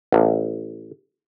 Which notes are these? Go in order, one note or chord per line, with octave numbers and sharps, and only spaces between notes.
A1